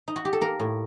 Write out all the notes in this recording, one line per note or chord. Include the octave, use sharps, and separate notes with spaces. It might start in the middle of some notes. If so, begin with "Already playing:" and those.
D#4
F#4
G4
A4
A#3 A#4
A2